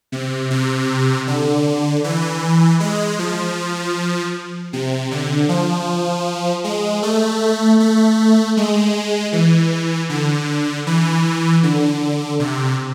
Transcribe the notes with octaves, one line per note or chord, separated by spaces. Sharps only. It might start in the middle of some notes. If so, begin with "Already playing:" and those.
C3
C3
D3
E3
G#3
F3
C3
D3
F3
G#3
A3
A3
G#3
E3
D3
E3
D3
C3